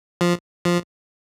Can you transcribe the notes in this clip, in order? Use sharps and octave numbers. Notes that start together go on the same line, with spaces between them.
F3
F3